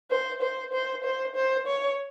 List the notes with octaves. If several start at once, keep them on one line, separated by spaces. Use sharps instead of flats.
C5
C5
C5
C5
C5
C#5